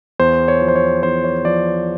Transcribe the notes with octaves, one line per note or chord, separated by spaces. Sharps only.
E2 C5
C#5
F3
C5
C#5
E2 C5
C#5
F3 D5